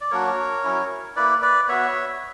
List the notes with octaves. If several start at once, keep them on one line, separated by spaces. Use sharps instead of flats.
D5
F#3 A#3 D4 F#4 A#4 C#5
F#3 C#4 E4
A#3 E4 B4 D5
B4 D5
B3 F#4 C#5 E5